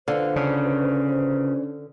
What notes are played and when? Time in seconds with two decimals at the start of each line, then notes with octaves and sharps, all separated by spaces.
0.08 D3 F4 B4 C5 F5
0.36 C#3 C#4 D4